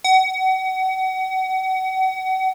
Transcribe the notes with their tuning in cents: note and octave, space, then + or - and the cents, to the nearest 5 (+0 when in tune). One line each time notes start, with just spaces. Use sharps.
F#5 +35